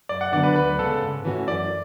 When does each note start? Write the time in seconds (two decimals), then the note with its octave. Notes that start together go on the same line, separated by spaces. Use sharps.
0.09 F#2 D5
0.21 F#5
0.32 D3 F#3 B3 D4 D5
0.44 B4
0.56 D2 B4
0.79 C#3 G#3 B3 A4
1.02 G#2
1.25 E3 A3 C#4 F#4
1.48 F#2 D5